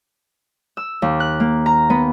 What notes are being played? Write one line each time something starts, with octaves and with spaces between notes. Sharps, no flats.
E6
D#2
F#6
A#3
A#5
B3